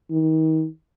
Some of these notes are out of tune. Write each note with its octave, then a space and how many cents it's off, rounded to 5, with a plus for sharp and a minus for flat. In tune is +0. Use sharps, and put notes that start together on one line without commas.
D#3 +35